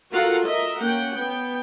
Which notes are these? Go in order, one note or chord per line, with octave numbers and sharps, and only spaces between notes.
F4 F#4 A4 A#4 F5 F#5
A#4 D#5 E5
A#3 C#4 F#5 G5
B3 G5